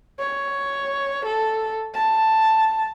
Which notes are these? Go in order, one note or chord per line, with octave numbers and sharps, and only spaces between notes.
C#5
A4
A5